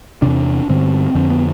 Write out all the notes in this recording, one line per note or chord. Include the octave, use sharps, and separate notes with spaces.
E2 C3 D4
G2 D3 C4
F2 D3 C4
B3